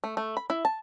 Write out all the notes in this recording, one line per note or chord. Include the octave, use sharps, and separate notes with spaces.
A3
A3
B5
E4
A5